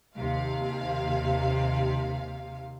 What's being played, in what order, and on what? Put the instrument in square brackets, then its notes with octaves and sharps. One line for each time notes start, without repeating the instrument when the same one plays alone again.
[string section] D#2 C3 F5